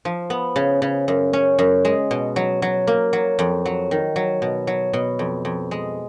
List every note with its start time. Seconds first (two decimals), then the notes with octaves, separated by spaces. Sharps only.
0.05 F3
0.30 B3
0.56 C#3
0.82 C#3
1.08 F#2
1.33 C#4
1.59 F#2
1.85 G#3
2.11 B2
2.36 F#3
2.62 F#3
2.87 A#3
3.13 F#3
3.39 F2
3.65 F#3
3.91 D#3
4.16 F#3
4.42 B2
4.67 F#3
4.93 B2
5.19 F2
5.45 F2
5.71 G#3